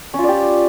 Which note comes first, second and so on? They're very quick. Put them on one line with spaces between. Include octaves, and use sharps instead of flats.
C#4 F4 D5 G4